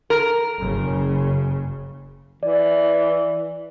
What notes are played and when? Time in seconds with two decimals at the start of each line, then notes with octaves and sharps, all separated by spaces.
0.10 A#4
0.61 F#1 C#3
2.43 E3 D5